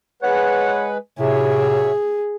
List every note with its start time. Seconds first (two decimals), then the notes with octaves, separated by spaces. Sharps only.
0.23 G#3 B4 C#5 F#5
1.19 A2 C3 F#3 G#4 C#5 E5